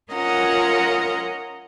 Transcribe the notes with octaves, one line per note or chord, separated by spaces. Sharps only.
C#4 F4 A#4 D#5 F#5 A#5